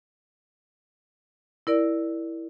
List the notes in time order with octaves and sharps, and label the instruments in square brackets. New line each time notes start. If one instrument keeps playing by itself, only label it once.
[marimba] E4 A#4 D5